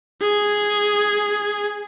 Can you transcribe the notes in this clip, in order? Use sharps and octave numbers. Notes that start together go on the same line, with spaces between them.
G#4 G#5